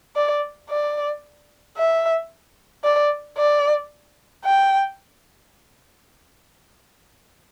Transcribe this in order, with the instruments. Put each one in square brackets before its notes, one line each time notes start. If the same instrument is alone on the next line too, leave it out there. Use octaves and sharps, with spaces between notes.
[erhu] D5
D5
E5
D5
D5
G5